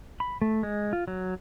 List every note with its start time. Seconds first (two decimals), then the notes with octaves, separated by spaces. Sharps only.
0.20 B5
0.42 A3
0.63 G#3
0.93 F4
1.08 F#3